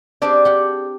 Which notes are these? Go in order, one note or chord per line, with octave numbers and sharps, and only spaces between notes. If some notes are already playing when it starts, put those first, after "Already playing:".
C4 D4 G4 G#4 D5
G4 F#5